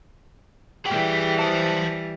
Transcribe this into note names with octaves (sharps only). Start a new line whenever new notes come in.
E3 G3 G#4 G5
C5 A5